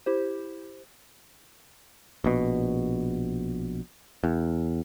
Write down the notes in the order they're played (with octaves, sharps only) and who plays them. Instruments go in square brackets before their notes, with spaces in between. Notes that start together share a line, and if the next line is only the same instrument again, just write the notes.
[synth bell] E4 G4 C5
[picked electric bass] A#1 B2
E2